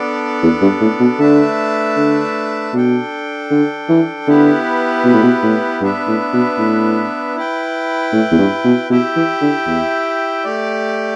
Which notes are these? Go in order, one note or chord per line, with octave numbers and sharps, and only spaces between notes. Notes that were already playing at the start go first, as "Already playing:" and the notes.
Already playing: B3 D4 A4 D5
E2
G2
A2
B2
D3 A3 D4 B4 E5 A5
D3
B2 D4 A4 G5
D3
E3
D3 B3 E4 G4 B4
B2
A2
B2
A2
G2 B3 D4 B4 E5
A2
B2
A2
E4 B4 G5
A2
E2
G2
B2
B2 E4 G4 E5 G5
E3
D3
E2
A3 G4 D5